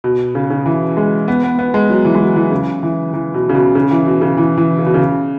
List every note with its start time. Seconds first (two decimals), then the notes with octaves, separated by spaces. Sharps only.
0.04 B2
0.35 C#3
0.50 C#3
0.66 E3
0.97 G#3
1.28 B3
1.43 B3
1.59 B3
1.74 G#3
1.90 F#3
2.05 E3
2.15 G#3
2.20 F#3
2.36 E3
2.51 C#3
2.83 E3
3.13 E3
3.34 B2
3.49 C#3
3.55 B2
3.75 C#3
3.91 E3
4.06 B2
4.21 C#3
4.38 E3
4.57 E3
4.78 C#3
4.86 B2
4.94 C#3